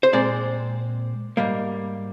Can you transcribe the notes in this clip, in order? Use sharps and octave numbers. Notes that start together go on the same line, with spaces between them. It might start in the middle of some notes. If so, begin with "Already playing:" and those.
C5
A#2 G#3 C4 D5
G#2 G3 A#3